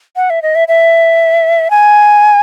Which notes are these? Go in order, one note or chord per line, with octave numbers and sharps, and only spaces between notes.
F#5
E5
D#5
E5
E5
G#5